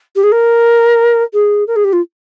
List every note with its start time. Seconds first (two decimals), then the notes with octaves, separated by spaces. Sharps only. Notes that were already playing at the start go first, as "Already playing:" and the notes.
0.16 G4
0.23 G#4
0.32 A#4
1.33 G#4
1.67 A#4
1.76 G#4
1.84 G4
1.93 F4